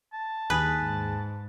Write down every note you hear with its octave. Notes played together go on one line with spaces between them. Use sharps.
A5
D#2 G#4 B4
G#2